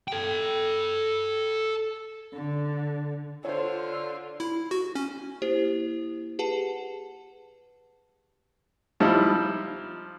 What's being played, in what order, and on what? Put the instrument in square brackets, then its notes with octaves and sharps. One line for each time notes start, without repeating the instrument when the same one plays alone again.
[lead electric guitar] A4 G5
[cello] D3
[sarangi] D3 [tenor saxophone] F4 [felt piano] C5 C#5
[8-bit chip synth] E4
F#4
C#4
[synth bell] A#3 E4 G4 C5
G4 G#4 B4 F#5 A5
[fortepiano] F3 G3 D#4 E4